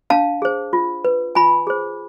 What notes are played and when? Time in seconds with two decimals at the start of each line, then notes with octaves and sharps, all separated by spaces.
0.10 D4 F5 A5
0.42 G#4 C5
0.73 F4
1.05 B4
1.35 F4 G#5 B5
1.67 G#4 C5